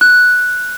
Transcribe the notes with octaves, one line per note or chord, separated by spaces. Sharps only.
F#6